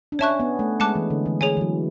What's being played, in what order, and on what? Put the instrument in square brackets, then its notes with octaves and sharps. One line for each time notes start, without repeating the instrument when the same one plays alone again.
[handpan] D4
[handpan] C#4 [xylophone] C#5 E5 A5 C#6 F#6
[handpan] B3
A3
[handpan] G#3 [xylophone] F#5 A5 D6 F#6
[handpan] E3
D3
E3
[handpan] E3 [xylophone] G#4 C#5 G#5
[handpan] E3
F#3